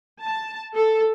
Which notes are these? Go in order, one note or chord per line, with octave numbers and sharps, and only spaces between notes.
A5
A4